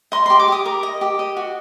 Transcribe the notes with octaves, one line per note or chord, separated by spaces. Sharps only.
D#5 C6
G4 C6
D6
G4 D#6
A#4
D#5
G4
D#5
F#4